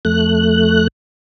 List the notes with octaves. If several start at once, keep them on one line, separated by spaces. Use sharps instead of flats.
F2 A3 F#6